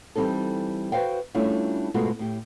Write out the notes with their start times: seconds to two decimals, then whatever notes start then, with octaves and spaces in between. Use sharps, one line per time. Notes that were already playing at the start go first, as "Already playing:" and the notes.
0.16 E3 G3 C4 D#4 A4
0.92 F#4 B4 C5 F5 G5
1.34 G3 A3 C#4 D4 E4 F4
1.94 G#2 B2 G#3 A3 F4 F#4
2.19 A2 G4